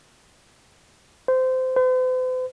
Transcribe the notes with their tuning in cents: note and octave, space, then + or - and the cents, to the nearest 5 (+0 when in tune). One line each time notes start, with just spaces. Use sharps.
C5 -20
C5 -45